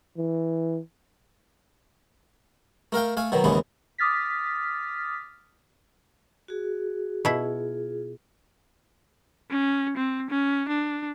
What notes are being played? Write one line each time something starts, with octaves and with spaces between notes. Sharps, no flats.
E3
A3 A#4 F5 G5
A3 F5 G#5
B2 D#3 F#3
D#2 G#2 C#3 E3 G#3 B3
D6 D#6 F6 A6 B6
F#4 G#4
B2 E4 F4 G#4
C#4
C4
C#4
D4